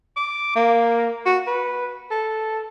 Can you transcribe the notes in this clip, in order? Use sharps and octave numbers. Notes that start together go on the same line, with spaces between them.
D6
A#3
F#4
B4
A4